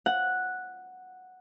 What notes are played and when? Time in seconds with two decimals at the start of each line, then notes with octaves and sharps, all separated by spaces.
0.06 F#5